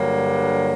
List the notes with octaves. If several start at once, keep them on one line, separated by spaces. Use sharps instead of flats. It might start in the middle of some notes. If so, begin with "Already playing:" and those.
Already playing: G2 D3 F#3 A#3